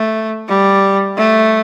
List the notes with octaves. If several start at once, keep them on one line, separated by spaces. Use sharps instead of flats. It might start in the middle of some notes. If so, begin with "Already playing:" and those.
Already playing: A3
G3
A3